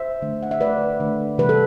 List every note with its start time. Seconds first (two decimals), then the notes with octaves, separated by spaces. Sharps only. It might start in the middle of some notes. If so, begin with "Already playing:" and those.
Already playing: C5 E5
0.22 D3 A3
0.43 F#5
0.51 E5
0.60 D3 A3 B4 D5
1.00 D3 A3
1.38 C3 E3 G3 B4
1.49 A4